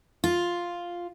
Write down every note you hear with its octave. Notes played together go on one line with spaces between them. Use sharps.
F4